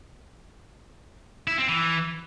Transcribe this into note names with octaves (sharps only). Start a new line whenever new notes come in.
E4
C4
E3